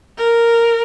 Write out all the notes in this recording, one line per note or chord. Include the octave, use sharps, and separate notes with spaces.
A#4